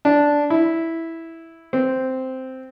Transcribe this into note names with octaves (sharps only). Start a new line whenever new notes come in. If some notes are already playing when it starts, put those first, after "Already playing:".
D4
E4
C4